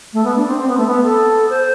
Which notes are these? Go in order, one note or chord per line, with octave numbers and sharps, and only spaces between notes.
A3
B3
D4
C4
C4
B3
A3
B3
A4
C5